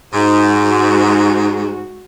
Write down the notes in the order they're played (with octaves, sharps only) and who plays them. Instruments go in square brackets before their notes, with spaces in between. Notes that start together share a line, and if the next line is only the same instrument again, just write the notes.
[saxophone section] G#2 [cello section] G#3 F#4